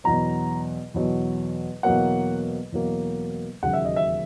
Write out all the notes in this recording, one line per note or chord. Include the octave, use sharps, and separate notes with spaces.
E2 B2 F#3 A#5
E2 B2 F#3
E2 B2 F#3 A#3 F#5
E2 B2 F#3 A#3
E1 D#2 C#3 F#3 F#5
E5
D#5
E5